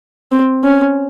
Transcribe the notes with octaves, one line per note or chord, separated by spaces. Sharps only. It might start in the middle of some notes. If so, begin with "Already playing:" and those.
C4
C#4